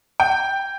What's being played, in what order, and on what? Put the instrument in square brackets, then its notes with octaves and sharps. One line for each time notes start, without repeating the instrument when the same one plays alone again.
[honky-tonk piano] G5